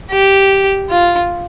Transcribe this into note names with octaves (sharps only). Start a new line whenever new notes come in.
G4
F4